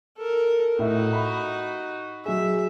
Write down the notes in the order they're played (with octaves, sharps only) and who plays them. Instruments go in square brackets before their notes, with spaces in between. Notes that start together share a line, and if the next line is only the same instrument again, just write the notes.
[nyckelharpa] A4 A#4
[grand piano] A2 E5 [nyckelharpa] D#4 F#4
[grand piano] B5
[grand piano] F#3 G#4 [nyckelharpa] E5